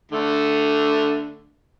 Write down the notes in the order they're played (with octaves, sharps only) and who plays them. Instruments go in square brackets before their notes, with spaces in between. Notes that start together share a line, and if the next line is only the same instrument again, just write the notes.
[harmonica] D3 A3